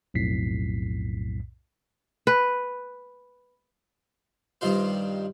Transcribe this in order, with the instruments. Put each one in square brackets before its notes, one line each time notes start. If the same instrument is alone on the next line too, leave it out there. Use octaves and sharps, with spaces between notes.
[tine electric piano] B1 F2 A2 B6 C7
[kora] B4
[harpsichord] G2 D#3 F4 C5